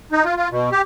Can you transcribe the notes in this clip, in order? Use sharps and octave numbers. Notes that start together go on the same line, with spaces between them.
D#4
F4
F4
B2
G4